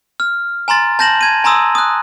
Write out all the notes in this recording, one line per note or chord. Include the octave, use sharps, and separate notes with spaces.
F6
G#5 A#5 C6 A6
A5 G6 A#6 E7 F#7
G#6 D#7
G#5 A#5 C6 D#6 E6
D#6 F#6